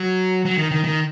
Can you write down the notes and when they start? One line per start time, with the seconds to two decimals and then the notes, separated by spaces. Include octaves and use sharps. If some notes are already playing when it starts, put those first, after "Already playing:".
Already playing: F#3
0.45 F#3
0.58 D#3
0.71 D#3
0.84 D#3